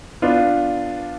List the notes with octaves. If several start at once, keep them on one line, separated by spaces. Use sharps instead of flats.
B3 D4 F4